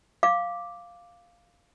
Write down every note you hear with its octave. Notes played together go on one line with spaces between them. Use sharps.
F5 D6